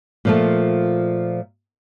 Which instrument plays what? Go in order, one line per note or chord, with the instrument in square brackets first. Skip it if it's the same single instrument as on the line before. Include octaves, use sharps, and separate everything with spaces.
[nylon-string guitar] A#2 F3 A3